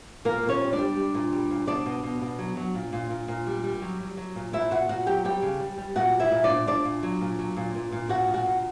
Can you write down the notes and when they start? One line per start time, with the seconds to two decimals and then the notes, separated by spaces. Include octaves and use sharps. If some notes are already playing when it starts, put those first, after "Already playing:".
0.25 A#2 A#3 A#4
0.43 A#2
0.49 C#4 C#5
0.61 G3
0.72 D4 D5
0.79 G3
0.97 G3
1.14 A#2
1.32 G3
1.50 A#2
1.67 B2 D4 D5
1.86 B2
2.04 B2
2.21 B2
2.39 F#3
2.57 F#3
2.75 A#2
2.93 A#2
3.10 A#2
3.28 A#2
3.47 G3
3.64 G3
3.82 F#3
4.00 F#3
4.17 F#3
4.35 A#2
4.53 A#2 E4 E5
4.71 A#2 F#4 F#5
4.88 A#2 F#4 F#5
5.07 F#3 G4 G5
5.25 G3 G4 G5
5.42 C#3
5.60 G3
5.78 G3
5.96 A#2 F#4 F#5
6.14 G3
6.20 E4 E5
6.32 A#2
6.43 D4 D5
6.49 A#2
6.67 A#2 D4 D5
6.85 A#2
7.03 F#3
7.21 A#2
7.39 F#3
7.57 A#2
7.75 A#2
7.92 A#2
8.09 A#2 F#4 F#5
8.28 A#2
8.34 F#4 F#5
8.46 A#2